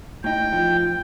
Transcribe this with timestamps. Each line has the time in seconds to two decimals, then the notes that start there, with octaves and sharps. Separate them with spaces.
0.24 A2 D#4 G5
0.53 F3